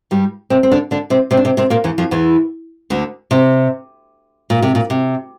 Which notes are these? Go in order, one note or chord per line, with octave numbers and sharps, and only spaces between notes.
G2 G3
C3 C4
C4
D3 D4
D3 D4
C3 C4
C3 C4
D4
C3 C4
C3 C4
A#2 A#3
E2 E3
F2 F3
E2 E3
D2 D3
C3
A#2
C3
A#2
C3